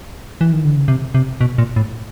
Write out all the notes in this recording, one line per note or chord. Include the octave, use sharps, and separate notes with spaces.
E3
D#3
D3
C#3
C3
C3
B2
A#2
A2